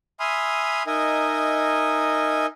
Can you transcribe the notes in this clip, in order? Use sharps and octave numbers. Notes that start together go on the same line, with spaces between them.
E5 G#5 B5 C6 D#6 F6
D#4 A#4 D#5 E5 G#5